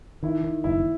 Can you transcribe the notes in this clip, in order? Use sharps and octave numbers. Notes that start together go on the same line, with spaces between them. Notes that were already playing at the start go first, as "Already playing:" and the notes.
D#3 E4
D#3
F#1 E4